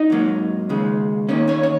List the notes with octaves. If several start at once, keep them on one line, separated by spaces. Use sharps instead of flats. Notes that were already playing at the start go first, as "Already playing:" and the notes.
Already playing: D#4 D#5
G#2 F#3 A#3
D#2 C#3 G#3
D#2 D#3 A#3 C#4 C#5
C#4 C#5
C#5